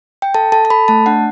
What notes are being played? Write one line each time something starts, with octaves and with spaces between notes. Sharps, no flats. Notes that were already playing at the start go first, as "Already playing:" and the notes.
G5
A4 A5
A4 A5
A5
A4 B5
A3 A5
D4 F#5